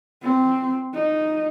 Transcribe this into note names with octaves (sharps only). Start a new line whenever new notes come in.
C4
D#4